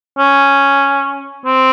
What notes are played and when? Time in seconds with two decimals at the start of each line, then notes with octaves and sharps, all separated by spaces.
0.19 C#4
1.46 C4